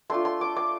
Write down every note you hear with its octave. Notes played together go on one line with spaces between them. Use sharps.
A3 D4 F4 C6
C6
D6
D6